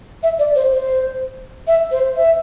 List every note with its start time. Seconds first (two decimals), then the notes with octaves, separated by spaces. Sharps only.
0.23 E5
0.39 D5
0.55 C5
0.71 C5
1.67 E5
1.91 C5
2.16 E5